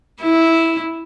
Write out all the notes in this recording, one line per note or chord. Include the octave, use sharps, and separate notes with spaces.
E4